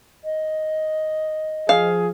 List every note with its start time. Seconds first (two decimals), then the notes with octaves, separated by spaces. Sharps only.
0.24 D#5
1.69 F3 G#4 F5